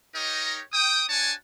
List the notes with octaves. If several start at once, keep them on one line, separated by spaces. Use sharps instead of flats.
D#4 G4 A#4 C#5 D#5
G5 D#6
D4 F#4 C#5 G#5 A5